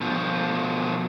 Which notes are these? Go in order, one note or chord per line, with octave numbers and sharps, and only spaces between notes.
B2 F3